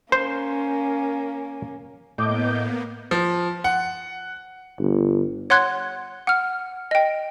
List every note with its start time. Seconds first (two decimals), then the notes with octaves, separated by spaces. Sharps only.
0.12 A#3 C#4 C5
2.18 A2 A#3 B3 D#5 D6 G6
3.11 F3
3.64 F#5
4.79 G1
5.50 C#5 F#5 C6 F#6 G#6
6.27 F#5 F6
6.91 D#5 G5